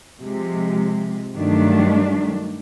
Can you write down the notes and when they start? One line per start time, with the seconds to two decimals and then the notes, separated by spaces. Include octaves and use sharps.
0.21 C3 F3 G#3
1.35 G2 D#3 F#3 A3 D4